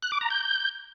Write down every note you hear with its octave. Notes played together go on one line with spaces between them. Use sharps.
F#6
D6
A#5
G6